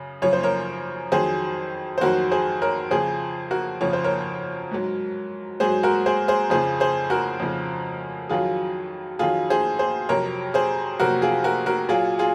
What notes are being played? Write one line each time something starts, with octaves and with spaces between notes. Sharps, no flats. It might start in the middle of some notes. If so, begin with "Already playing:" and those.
Already playing: F#2 C#3
F#2 C#3 F3 C#5
C5
A#4 C#5
F2 D#3 F#3 G#4 C5
C5
F2 D#3 F#3 F#4 A#4
G#4 C5
A#4 C#5
F2 C#3 F3 G#4 C5
F#4 A#4
F2 C#3 F3 C#5
C5
A#4 C#5
G#2 F#3
G#2 F#3 G#4 C5
F#4 A#4
G#4 C5
G#4 C5
F2 C#3 F3 G#4 C5
G#4 C5
F#4 A#4
F2 C#3 F3
F2 D#3 F#3 F4 G#4
F2 D#3 F#3 F4 G#4
G#4 C5
G#4 C5
F2 C3 F#3 A#4 C#5
G#4 C5
F2 C3 F#3 F#4 A#4
F4 G#4
F#4 A#4
F#4 A#4
A#2 F#3 F4 G#4
F4 G#4